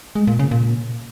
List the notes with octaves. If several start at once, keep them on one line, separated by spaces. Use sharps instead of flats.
G#3
A#2
C#3
A#2